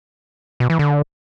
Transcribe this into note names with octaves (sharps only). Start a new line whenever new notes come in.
B2
E3
D3